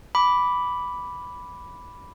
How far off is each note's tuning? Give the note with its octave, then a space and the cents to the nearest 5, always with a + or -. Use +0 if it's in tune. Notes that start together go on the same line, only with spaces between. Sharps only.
B5 +0 D6 -10